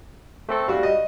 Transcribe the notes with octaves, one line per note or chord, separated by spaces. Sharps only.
A3 C4 A4
G3 F#4 F5
D#5